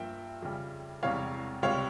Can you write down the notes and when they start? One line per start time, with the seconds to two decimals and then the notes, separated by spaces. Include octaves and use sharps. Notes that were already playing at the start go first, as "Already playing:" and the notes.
Already playing: G2 F3 A#3 E5 G5
0.42 F2 C#3 G3
1.03 E1 E2 C3 G3 C#5 F5
1.63 C#2 C3 G3 C#5 F5